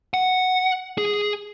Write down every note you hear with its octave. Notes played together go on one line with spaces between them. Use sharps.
F#5
G#4